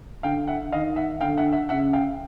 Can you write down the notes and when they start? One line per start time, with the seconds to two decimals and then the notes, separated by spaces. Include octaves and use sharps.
0.23 D3 F5 G5
0.48 E5 F#5
0.72 D#3 D#5 F5
0.96 E5 F#5
1.21 D3 F5 G5
1.38 E5 F#5
1.53 E5 F#5
1.69 C#3 E5 F#5
1.93 F5 G5